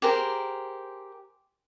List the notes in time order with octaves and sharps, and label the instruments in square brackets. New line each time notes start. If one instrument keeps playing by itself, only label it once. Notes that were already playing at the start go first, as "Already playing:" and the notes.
[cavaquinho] G4 G#4 A#4 C5